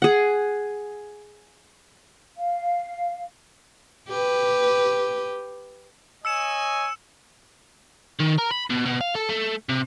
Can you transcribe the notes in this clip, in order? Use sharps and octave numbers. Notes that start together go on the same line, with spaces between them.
G#4 F#5
F5
G4 B4
C#5 D#5 G#5 E6 C#7 E7
D#3
A#4
B5
B2
B2
F5
A4
A3
C3